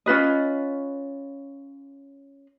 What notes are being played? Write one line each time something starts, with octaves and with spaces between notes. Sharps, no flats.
C#4 F4 B4 D#5